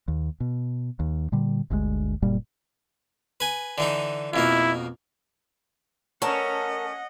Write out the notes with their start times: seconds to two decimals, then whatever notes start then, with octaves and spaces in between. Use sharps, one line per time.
0.08 D#2
0.40 B2
1.00 D#2
1.32 A#2 D3 G3
1.70 G1 D2 B2 G#3
2.22 F#1 A#2 G3 A#3
3.40 B4 G#5
3.78 D3 E3 D#4
4.34 F2 B2 A#3 E4
6.22 A3 C#4 A#4 C#5 D#5 F#5 A5